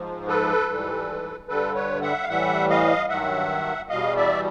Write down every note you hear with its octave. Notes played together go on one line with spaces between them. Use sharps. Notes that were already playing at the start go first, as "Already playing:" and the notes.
Already playing: G#2 F3
A4 B4
G#2 E3 G3
G2 D3 G3 A4 B4
B4 C#5
E5 F#5
F5
A2 E3 G3 E5 F#5
D#5 F5
G2 D#3 F#3 E5 F#5
E2 B2 G3 D#5 F5
D5 E5